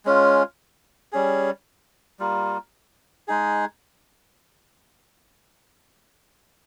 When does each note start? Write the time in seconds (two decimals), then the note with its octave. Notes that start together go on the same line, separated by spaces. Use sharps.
0.05 G#3 C#4 F4
1.12 G3 C#4 G#4
2.20 G3 A#3 F4
3.28 G#3 D#4 G#4